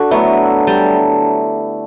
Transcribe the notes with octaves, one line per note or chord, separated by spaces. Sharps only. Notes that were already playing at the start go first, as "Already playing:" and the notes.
Already playing: D4 F#4 A4
D3 F#3 A3 B3 E4
G3